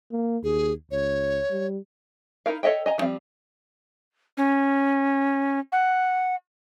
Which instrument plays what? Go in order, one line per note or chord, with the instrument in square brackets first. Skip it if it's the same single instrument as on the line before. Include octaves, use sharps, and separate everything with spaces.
[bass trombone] A#3
[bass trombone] D#2 [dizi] G#4
[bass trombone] C#2 [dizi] C#5
[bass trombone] G3
[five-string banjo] D#4 E4 A#4 F5
A4 C#5 D#5 E5 G5
D#5 G#5 A#5
E3 F3 G3 C4 F5
[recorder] C#4
F#5